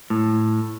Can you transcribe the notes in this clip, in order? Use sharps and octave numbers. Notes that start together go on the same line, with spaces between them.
A2